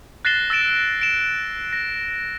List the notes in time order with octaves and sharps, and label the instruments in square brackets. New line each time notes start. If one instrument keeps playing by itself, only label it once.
[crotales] F#6 A6 A#6 C7 E7 G7
E6 A6 A#6 D7 E7
D7 E7
A#6